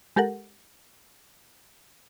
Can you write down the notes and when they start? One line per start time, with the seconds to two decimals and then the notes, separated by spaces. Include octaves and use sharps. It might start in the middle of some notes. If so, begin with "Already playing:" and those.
0.16 G#3 G4 A4 A#4 F#5